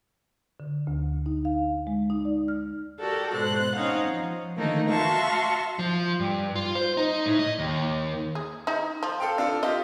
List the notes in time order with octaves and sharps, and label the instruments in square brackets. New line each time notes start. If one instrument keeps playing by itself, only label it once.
[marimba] D3
D2
D#4
F5
G#3
D#4
D5
F6
[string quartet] F#4 G4 A4 A#4 D5
G#2 B2 C5 F#6
C4 C#4 D#4 F5 F#5
F3
D3 D#3 A3 A#3 D#4
F#4 E5 F5 A5 C6 C#6
[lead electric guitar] F3
G2
F4
C5
D#4
A2
D#5
D#2
[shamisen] G#4
D#4 E4
F3
[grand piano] A4 F5 G5
[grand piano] D4 F4 A4 [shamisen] F5
[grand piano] F4 G4 [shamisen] D#5